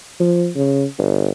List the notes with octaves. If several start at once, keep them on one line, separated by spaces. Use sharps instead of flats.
F3
C#3
G1